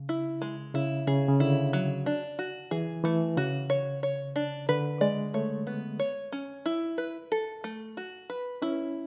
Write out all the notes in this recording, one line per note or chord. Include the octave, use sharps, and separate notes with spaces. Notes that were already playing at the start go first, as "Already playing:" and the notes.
Already playing: C#3
E4
G#3
C#3 E4
C#3 G#4
C#3
D3 E4
F#3
D4
F#4
E3 G#4
E3 A3
C#3 F#4
C#5
C#5
D4
D3 B4
G#3 D5
A3 C#5
B3
C#5
C#4
E4
B4
A4
A3
F#4
B4
C#4 E4